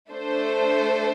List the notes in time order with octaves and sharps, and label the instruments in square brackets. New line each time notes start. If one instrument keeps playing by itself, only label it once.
[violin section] A3 D4 A4 C5